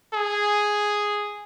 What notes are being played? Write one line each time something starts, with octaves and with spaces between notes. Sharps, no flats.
G#4